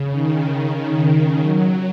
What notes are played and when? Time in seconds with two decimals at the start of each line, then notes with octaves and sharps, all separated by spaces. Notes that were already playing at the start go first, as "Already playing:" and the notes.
Already playing: C#3
0.11 D#3
1.39 F#3